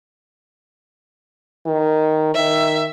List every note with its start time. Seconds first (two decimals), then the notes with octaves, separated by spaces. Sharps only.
1.66 D#3
2.35 D#3 E5